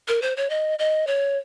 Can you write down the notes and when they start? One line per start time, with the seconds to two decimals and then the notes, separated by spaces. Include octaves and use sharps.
0.08 A#4
0.22 C5
0.37 C#5
0.50 D#5
0.79 D#5
1.07 C#5